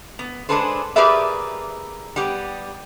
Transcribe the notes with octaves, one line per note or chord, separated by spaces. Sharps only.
B3
G#3 D4 G#4 A4 B4 C5
G4 G#4 A#4 B4 D5 E5
G3 B3 G4